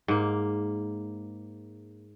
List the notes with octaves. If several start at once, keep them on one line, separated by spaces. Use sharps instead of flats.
G#2 A#3